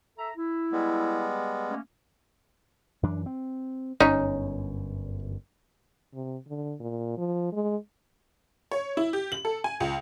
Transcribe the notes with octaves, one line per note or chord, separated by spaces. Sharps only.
A4 E5 A#5
E4
G3 G#3 B3
A3 A#3 C#4
F#2 E3 D4
C4
G1 F#2 C#4 D#4 C#5
C3
D3
A#2
F3
G#3
C#5
E4
G4
F#7
A4
G#5
C#2